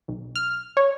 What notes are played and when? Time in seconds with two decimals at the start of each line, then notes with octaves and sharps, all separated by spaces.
0.08 B1
0.36 F6
0.77 C#5